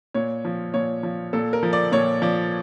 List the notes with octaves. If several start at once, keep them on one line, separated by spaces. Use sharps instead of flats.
A#2 C#5
F3
A#2 C#5
F3
A#2 A4
A#4
F3
D5
A#2 C#5
F3 D5